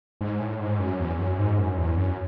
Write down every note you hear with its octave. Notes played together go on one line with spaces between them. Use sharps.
G#2
A2
G#2
F#2
E2
F#2
G#2
F#2
E2
F#2